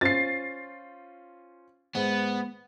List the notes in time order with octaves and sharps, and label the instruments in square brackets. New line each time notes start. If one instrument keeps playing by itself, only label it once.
[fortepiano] C#4 F4 C5 [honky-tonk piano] A6 C7
[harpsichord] G#2 [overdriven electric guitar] B3